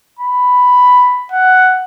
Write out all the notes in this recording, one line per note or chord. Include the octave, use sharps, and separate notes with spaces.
B5
F#5